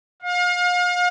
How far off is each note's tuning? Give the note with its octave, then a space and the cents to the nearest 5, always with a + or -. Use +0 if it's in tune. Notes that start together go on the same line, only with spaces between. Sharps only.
F5 +35